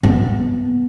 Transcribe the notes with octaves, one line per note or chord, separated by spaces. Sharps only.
B3